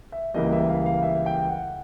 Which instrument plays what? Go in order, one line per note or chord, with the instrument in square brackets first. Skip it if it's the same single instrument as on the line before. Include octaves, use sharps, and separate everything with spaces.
[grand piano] E5
C#2 C#3 E3 G3 A#3 D#5
E5
F5
F5
E5
G5
F#5